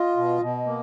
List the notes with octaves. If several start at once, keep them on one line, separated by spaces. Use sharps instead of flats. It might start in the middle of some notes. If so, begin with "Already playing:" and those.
Already playing: F4 D#5
B2
B2
A#3